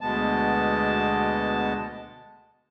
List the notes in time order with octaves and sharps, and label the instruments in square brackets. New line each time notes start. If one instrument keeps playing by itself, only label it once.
[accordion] D2 B2 G#3 B3 A5